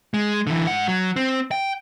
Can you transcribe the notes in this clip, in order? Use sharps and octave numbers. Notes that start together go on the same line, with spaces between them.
G#3
D3 E3
G#2 F#5
F#3
C4
G5